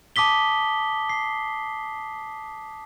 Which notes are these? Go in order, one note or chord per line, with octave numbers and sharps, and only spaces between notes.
A5 D6 D#6 B6 G7
C7